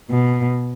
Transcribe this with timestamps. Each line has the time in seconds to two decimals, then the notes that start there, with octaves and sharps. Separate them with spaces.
0.10 B2